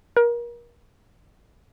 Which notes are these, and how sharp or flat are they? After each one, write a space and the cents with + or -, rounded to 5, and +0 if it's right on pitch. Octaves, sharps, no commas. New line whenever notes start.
A#4 +30